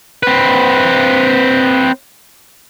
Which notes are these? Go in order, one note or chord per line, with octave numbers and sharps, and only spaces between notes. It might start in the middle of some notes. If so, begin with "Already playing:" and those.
C4 B4